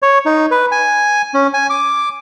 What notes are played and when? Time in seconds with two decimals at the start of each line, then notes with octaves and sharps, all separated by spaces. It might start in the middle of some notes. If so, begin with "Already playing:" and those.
0.02 C#5
0.26 D#4
0.51 B4
0.72 G#5
1.34 C#4
1.54 G#5
1.70 D6